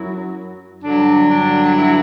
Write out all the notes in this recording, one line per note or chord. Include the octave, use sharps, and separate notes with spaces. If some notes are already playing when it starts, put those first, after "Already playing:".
Already playing: F#2 F#3 E4
G2 D3 F#3 D4
D4
E4